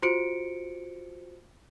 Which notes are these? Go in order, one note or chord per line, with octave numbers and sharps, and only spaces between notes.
F4 F#4 C5 C#7 D7